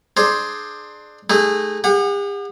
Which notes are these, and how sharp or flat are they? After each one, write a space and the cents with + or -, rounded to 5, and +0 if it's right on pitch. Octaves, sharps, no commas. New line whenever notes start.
D4 +25 G#4 +20 C5 +10
A3 -25 D#4 +0 G#4 -30
G4 +45 F#5 -10